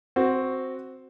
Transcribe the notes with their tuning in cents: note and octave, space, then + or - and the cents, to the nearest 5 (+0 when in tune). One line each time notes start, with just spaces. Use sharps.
C4 +0 F#4 +0